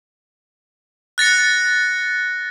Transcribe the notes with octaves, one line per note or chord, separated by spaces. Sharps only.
F#6 A6 A#6 C#7